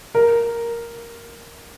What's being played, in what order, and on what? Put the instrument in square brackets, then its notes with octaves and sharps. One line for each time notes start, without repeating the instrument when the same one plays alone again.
[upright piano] A#4